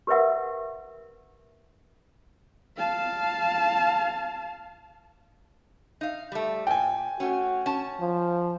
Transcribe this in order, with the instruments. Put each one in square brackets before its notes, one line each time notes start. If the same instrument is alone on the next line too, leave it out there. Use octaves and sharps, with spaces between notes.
[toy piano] G4 A#4 B4 E5 F#5
[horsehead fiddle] F5 A5
[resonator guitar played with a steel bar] D#4 F5
G3 A3
[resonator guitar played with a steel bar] A#2 [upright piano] G5 G#5
[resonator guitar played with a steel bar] A3 C#4 [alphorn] F#4
[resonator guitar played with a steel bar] C#4 A5
[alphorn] F3